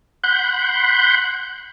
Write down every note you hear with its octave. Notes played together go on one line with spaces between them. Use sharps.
F#5 B5 C6 F#6 G6